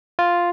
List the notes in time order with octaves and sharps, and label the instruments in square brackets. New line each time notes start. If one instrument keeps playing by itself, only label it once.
[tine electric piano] F4